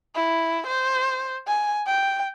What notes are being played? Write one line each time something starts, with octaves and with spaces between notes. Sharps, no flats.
E4
C5
G#5
G5